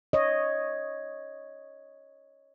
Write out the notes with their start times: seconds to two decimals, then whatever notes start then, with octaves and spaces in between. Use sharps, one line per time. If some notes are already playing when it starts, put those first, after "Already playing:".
0.13 C#5 D#5